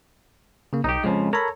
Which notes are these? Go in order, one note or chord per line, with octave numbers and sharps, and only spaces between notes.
C#3 A#3
B1 D#4 G4
F2 C#3 F3 G#3
A4 A#4 C#5 A#5 B5